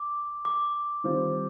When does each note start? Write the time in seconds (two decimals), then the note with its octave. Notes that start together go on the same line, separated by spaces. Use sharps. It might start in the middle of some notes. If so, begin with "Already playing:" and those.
Already playing: D6
0.45 D6
1.04 D#3 G3 C4 F4 C5